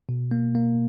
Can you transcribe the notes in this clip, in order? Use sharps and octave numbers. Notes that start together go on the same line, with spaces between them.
B2
A#3
A#3